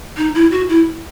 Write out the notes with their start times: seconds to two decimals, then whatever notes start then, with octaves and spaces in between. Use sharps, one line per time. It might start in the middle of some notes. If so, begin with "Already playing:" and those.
0.17 D#4
0.35 E4
0.51 F#4
0.69 E4